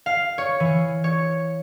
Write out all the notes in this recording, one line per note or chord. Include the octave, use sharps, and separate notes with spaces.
F5
C#5
E3
C#5